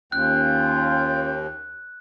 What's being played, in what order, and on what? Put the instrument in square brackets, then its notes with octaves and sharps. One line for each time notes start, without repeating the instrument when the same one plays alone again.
[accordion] D#2 [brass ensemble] C#4 F4 [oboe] G5 [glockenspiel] F#6